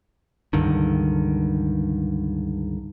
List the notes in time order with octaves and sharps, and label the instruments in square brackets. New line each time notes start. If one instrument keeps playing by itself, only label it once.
[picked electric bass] C#2 G2 D3 D#3